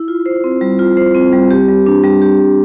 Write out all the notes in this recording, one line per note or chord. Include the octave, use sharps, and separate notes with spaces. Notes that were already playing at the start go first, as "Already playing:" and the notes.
Already playing: E4
F4
C5
C4
G3
F4
C5
C4
G3
G4
G3
D4
G3
G4
G3